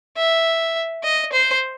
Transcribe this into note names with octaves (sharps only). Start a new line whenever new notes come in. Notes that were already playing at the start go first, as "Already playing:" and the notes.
E5
D#5
C5